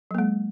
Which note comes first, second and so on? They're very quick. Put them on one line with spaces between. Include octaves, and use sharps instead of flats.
F#3 A#3 G#3